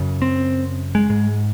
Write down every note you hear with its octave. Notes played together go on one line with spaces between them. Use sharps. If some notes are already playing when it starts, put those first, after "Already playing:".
Already playing: F#2 C#3
C4
G#3
G#2